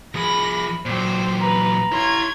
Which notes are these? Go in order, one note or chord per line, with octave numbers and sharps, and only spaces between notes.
F3 G#4 B5 A#6
A#2 F#3 C5 G5
B4 A#5
E4 C#5 C6 G#6